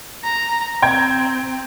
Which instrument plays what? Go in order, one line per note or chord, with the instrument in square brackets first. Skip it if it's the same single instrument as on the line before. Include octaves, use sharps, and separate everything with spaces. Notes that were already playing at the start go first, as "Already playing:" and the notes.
[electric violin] A#5
[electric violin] C4 [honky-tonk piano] G5 A#5 G#6